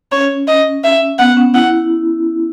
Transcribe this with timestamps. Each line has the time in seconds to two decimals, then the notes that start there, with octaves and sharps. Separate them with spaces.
0.12 C#4 C#5
0.48 D#5
0.84 E5
1.19 B3 F#5
1.37 C#4
1.54 E4 F#5